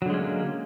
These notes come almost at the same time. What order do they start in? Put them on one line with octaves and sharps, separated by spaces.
F#3 D3 G#3 C#4 A#3